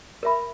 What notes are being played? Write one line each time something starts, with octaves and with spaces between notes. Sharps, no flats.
A#4 E5 B5